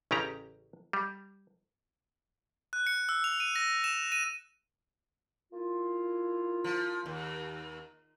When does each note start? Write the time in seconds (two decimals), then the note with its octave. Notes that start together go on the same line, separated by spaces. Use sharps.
0.11 A1 C#3 C#4 G4 A#5
0.93 G3
2.73 F#6
2.87 C#7
3.09 E6
3.24 F7
3.40 D#7
3.56 A#6
3.84 E7
4.12 D#7
5.52 A#3 E4 F4
6.64 F3
7.06 D#2